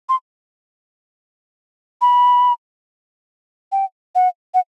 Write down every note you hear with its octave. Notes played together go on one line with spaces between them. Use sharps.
C6
B5
G5
F#5
F#5